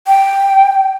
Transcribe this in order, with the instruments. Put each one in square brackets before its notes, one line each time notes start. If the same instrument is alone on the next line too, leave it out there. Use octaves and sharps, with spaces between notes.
[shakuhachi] G5